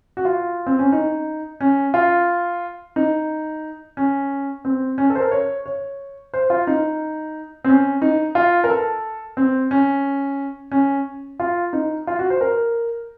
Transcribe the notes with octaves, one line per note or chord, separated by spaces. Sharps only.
F#4
F4
C4
C#4
D#4
C#4
F4
D#4
C#4
C4
C#4
A4
C5
A#4
C#5
C#5
C5
F4
D#4
C4
C#4
D#4
F4
A#4
A4
C4
C#4
C#4
F4
D#4
F4
F#4
C5
A#4